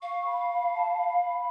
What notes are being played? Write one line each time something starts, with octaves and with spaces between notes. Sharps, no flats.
F5 C#6
B5
B5
A5
B5